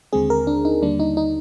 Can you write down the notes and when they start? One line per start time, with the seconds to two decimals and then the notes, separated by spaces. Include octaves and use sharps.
0.13 D#2 D3 G#3 C4 G#4
0.30 A#4
0.47 D4
0.65 D#4
0.82 D#2 D3 G3 A#3 D4
1.00 D#4
1.17 D#4